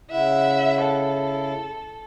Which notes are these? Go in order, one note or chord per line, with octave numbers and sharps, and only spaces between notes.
C#3 E4 E5 F#5
A4